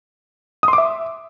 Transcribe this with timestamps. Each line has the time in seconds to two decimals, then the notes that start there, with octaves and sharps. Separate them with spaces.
0.63 D#6
0.68 C6
0.73 D6
0.78 E5